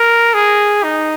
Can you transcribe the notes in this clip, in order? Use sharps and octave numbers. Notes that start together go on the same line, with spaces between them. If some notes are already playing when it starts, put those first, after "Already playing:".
Already playing: A#4
G#4
D#4